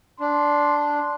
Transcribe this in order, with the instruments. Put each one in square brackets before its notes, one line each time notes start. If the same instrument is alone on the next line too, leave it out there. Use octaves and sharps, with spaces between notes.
[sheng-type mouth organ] D4 [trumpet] C6